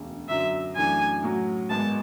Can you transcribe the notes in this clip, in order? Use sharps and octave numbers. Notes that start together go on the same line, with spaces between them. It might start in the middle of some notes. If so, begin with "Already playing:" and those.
Already playing: E1 D2 C#3
F#2 D3 F#3 E5
F#2 E3 A3 D4 G#5
A2 F#3 C#4 F#4
G#1 G#2 G#3 B3 A5